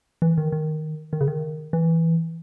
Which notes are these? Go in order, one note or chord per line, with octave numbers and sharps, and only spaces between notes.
E3
D#3
D#3
D#3
C#3
D#3
E3